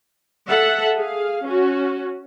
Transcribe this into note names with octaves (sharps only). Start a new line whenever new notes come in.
A4 E5 F#5
G#4 F5
C#4 F#4